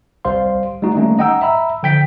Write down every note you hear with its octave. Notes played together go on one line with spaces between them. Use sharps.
C2 G3 C5 F5 C6
G3 A3 D#4 F#4
D#3 G3 A3 A#3 C#4 D#4
D#5 F#5 G5 A#5 E6
E5 A#5 B5 E6
D3 F3 G5 G6 B6